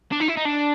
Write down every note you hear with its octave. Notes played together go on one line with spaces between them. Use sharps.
D4
D#4
E4
D#4
D4